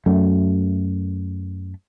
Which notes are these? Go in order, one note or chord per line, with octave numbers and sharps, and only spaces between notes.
F#2 A3